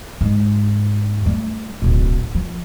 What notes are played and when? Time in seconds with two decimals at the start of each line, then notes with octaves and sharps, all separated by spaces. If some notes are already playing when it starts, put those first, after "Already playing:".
0.21 G#2
1.26 G3 A3
1.82 D1 B1
2.35 F3